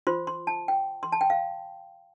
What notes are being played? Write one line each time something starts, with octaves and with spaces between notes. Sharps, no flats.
F4 C5 C6
C6
A5
G5
C6
A5
G5
F5